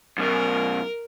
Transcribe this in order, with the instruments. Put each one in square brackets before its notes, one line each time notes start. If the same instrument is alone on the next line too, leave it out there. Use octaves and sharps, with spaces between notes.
[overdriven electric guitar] F#2 B2 [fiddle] A#4